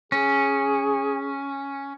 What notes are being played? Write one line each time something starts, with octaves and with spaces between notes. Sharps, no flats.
C#4 G#4